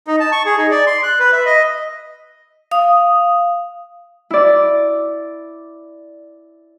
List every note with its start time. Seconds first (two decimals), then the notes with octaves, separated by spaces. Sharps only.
0.07 D#4
0.20 A5
0.32 C#6
0.46 G#4
0.58 D#4
0.71 D5
0.87 C6
1.03 F#6
1.19 B4
1.33 E5
1.46 D#5
2.71 F5 D#6
4.30 E4 D5